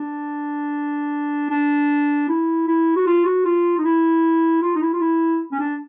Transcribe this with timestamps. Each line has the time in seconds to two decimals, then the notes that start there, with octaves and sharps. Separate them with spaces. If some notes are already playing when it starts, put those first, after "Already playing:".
Already playing: D4
1.50 D4
2.28 E4
2.67 E4
2.96 F#4
3.07 F4
3.25 F#4
3.45 F4
3.78 D#4
3.85 E4
4.62 F4
4.75 D#4
4.82 E4
4.93 F4
5.01 E4
5.52 C#4
5.60 D4